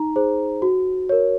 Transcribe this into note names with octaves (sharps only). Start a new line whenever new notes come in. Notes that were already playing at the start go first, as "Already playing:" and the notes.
Already playing: D#4 A#5
G#4 C5
F#4
A#4 C#5